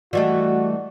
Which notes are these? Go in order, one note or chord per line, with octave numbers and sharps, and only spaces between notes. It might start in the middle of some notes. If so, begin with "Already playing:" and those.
E3 G3 A3 F#4 D5 D#5 F#5